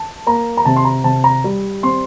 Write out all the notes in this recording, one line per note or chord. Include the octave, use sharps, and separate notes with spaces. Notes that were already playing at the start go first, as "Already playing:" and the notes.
Already playing: A5
A#3 A#5
A#5
C3 A5
C6
A#5
C3 A5
A#5
G3
C4 C6